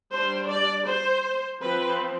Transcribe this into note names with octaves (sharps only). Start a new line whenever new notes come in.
G3 D4 C5
D5
C5
F3 C4 B4